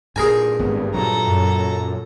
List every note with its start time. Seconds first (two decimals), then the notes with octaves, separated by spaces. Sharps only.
0.16 G2 A#2 G#4 A#4 G#5
0.59 G#1 G2 B3
0.94 A#2 F#3 A4 A#5
1.26 F#2